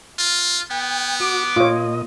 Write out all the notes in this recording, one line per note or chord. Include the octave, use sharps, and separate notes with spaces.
F4
B3 G5
F#4 D6
A#2 F4 C#5 D#5